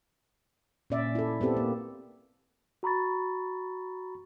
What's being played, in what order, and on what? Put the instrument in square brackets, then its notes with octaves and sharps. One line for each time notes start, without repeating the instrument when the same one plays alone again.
[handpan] A#2 C#4 D5 E5
E4 A4
B3 C4 G4 A4
A#3
[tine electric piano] F#4 A#5 B5 C#6 A6